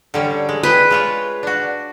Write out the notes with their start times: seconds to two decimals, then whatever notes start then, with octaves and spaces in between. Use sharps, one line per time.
0.14 D3 G3 C#4
0.49 G#3
0.63 G#4 B4 C5 G5
0.91 G#3 F4 C#5
1.43 D4 F#4